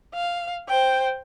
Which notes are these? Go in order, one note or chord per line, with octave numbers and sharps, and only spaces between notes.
F5
C5 G5